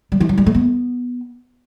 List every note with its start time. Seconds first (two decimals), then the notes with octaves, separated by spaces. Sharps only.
0.12 G3
0.20 E3
0.29 F#3
0.38 G3
0.46 A3
0.54 B3